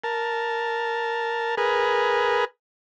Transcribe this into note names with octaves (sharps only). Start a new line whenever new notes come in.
A#4 A5
G#4 A#4 B4